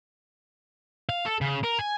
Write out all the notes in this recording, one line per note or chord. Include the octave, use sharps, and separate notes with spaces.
F5
A4
C#3
A#4
G#5